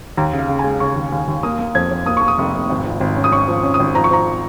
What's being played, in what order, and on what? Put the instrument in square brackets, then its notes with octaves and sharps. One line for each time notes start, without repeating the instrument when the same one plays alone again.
[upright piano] D#2 [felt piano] A#5
[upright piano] C#3
[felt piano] F5
[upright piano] C#3
[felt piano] G#5
[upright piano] G#3
[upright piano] C#3 [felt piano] C#6
[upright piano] D#2
D#2
D#2
[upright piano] A#3 [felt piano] D#6
[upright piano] A#3
[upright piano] F2 [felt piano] G#6
[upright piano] F2
[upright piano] A#3 [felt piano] D#6
[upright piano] A#3 [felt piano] C#6
[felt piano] D#6
[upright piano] F1
F1
G#1
F3
G#1
C#4
[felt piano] D#6
[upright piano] C#4 [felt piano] C#6
[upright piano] F3
C#4
[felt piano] D#6
[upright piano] G#1
[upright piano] F3 [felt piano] A#5
[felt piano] C#6
[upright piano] F3 [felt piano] A#5